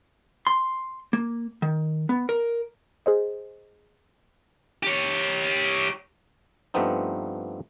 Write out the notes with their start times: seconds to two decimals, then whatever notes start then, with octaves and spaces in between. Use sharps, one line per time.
0.47 C6
1.13 A#3
1.62 D#3
2.09 B3
2.29 A#4
3.06 G#4 C5 D#5
4.83 G4 C#5
6.74 G2 F3 A3 B3 C4 D#4